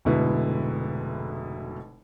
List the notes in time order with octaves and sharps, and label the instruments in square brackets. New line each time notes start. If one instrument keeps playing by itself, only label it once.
[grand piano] F1 G#2 B2 D3 E4 B4